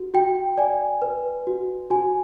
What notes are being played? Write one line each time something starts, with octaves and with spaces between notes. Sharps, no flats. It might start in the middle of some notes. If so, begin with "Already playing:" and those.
Already playing: F#4
F#4 G5
D5 G#5
B4
F#4
F#4 G#5